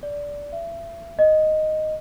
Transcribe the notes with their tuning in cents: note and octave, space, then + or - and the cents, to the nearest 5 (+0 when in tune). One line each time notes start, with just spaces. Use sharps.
D5 -15
E5 +35
D#5 -5